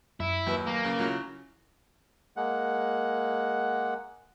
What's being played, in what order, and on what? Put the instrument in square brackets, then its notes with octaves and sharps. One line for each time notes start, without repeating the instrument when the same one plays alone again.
[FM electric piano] F#2 [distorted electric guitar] E4
[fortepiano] D#2 [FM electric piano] F#3 B4 B5
[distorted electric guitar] A#3
[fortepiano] C#3
[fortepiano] C#3 F#3 [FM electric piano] E4 F4
[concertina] G#3 A#3 F#5